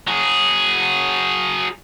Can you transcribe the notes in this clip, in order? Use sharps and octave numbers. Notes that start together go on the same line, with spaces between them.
F#3 G#4